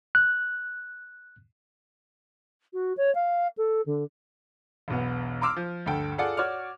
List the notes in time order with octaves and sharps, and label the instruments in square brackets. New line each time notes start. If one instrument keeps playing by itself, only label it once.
[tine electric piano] F#6
[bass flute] F#4
C#5
F5
A4
D3
[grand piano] E1 B1 B3
A#5 C6 D6 E6 F6
F3
D2 G2 A4 G5
F4 G#4 A4 D5 F#5
F#4 C#5 D5 D6 F6